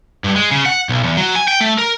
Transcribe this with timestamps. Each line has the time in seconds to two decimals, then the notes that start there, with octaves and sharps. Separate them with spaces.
0.24 G2
0.36 G#3
0.51 C#3
0.66 F#5
0.89 B1
1.03 E2
1.17 F#3
1.35 G#5
1.48 G5
1.61 A3
1.78 A#4